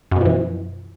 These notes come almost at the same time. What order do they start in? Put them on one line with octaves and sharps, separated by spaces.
F#2 B2 F3 E3